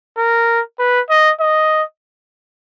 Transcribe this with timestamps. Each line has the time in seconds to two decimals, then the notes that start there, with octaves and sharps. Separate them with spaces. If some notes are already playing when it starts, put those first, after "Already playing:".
0.17 A#4
0.79 B4
1.10 D#5
1.40 D#5